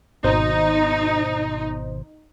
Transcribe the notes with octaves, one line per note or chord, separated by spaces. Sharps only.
G#1 B2 D#4 C5